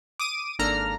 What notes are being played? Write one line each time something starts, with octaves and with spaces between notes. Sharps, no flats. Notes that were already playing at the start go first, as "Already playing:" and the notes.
D6 D#6 D#7
G#1 A#3 D4 A4 A#5 F6